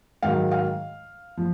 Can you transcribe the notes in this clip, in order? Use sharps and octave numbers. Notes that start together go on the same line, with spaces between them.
G#2 D#3 F#3 F5
F5
F3